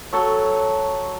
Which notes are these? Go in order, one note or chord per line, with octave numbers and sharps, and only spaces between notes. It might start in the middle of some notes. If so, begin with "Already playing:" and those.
F#3 A4 C#5